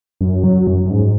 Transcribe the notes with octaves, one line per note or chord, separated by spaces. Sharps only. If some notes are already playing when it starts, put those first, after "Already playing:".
F#2
F#3
F#2
F#2
G#2